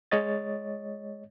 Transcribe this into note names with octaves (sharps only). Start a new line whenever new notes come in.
G#3 C#5 D#5 A6